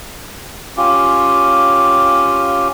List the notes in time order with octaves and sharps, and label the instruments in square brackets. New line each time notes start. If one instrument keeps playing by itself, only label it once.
[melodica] C#4 F4 G4